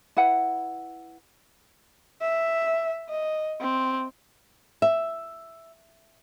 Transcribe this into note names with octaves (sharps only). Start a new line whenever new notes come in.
E4 B4 F#5
E5
D#5
C4
E5